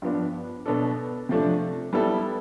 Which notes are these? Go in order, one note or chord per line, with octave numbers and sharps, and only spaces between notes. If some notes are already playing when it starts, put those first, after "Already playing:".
G2 F3 B3 D4
B2 B3 D4 A4
C3 F3 A3 D4
G3 B3 E4 A4